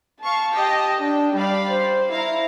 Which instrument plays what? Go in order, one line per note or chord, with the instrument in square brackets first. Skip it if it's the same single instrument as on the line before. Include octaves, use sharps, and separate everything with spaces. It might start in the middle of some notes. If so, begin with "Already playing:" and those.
[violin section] F5 C#6 [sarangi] A5
[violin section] G4 D#5 G5
[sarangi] D4 [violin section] G5
[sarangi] G3 [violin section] D5 F5 B5
[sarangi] C5
[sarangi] E4 [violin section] F5 A#5